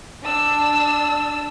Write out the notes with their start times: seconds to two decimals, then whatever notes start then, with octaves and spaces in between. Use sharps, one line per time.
0.22 D4 E6